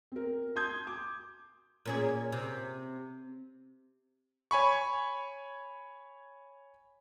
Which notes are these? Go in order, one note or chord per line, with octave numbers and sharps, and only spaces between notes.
C4 A#4
A5 C6 D#6 G6 G#6
D6
A#2 C#4 G#4
C3
C#5 G#5 B5 C#6